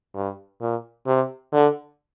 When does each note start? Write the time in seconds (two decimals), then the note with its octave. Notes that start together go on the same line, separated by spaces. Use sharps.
0.15 G2
0.61 A#2
1.07 C3
1.53 D3